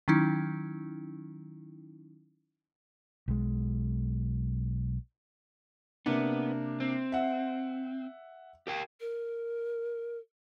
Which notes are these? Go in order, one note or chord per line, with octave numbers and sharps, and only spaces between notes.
D#3 F#3 C#4 D#4 E4
B1 G#3
C3 A#3 B3 D4
C4
E5 F#5
G4 A#4 G5
A#4